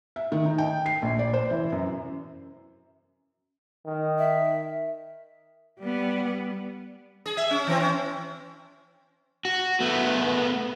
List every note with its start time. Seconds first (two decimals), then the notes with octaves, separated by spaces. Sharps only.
0.16 E5
0.32 D#3
0.46 D#4
0.58 G5
0.86 C7
1.02 A#1
1.19 D5
1.34 C5
1.51 E3
1.72 F#2
3.85 D#3
4.18 E5
5.80 G3 B3
7.26 G#4
7.37 E5
7.51 C#4
7.67 E3 C4
7.80 C#4
9.45 F#4
9.80 A3 B3